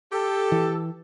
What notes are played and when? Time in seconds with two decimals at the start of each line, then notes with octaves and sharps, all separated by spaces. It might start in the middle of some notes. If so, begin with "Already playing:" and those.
0.12 G4 A4
0.52 E3